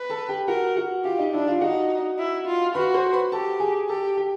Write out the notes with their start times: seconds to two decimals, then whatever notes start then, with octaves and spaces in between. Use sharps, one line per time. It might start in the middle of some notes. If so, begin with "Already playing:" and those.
Already playing: B4
0.10 A4 A5
0.29 G4 G5
0.48 F#4 A#4 F#5
0.76 F#4 F#5
1.04 F4 G4 F5
1.19 D#4 D#5
1.33 D4 E4 E5
1.47 F4 F5
1.61 D#4 F#4 F#5
2.18 E4
2.47 F4
2.75 F#4 B4 B5
2.94 C5 C6
3.13 B4 B5
3.32 G4 A4 A5
3.60 G#4 G#5
3.89 G4 A4 A5
4.17 G4 G5